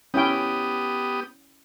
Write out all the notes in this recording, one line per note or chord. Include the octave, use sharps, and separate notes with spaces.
B3 C#4 E4 G4 G5 D#6